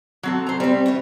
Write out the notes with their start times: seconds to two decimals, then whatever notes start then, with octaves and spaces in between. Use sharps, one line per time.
0.23 F#3 C4 A4
0.46 C5 A#5
0.60 G3 C4 C5
0.86 B3 C#4 E5